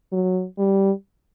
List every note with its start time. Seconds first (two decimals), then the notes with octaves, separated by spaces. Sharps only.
0.12 F#3
0.58 G3